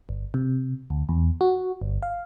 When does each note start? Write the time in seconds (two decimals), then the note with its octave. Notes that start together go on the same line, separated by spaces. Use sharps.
0.09 G1
0.34 C3
0.90 D2
1.09 E2
1.41 F#4
1.81 G1
2.02 F5